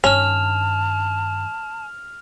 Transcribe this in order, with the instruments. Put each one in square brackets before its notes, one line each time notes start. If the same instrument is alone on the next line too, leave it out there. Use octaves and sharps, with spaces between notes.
[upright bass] G2 D#3 [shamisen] C#4 [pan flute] A5 [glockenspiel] F6 F7